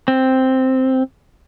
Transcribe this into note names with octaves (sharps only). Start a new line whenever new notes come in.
C4